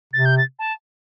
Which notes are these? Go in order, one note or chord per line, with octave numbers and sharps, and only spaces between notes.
C3 A6
G6
A6
A5